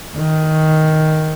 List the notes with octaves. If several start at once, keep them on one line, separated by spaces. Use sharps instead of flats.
D#3